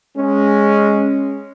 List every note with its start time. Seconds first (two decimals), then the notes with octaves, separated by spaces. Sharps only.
0.16 G#3 C#4